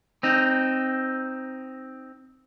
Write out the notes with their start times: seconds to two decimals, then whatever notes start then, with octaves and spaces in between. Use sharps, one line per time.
0.23 C4 D#4